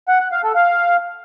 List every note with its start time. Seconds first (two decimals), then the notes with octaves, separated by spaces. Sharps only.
0.08 F#5
0.20 F#5
0.32 F5
0.43 A4
0.55 F5